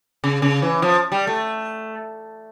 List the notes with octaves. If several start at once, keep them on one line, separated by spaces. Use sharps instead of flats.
C#3
C#3
E3
F3
G3
A3